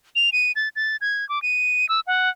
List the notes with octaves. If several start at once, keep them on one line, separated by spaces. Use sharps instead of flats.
F7
D#7
A6
A6
G#6
D6
D#7
E6
F#5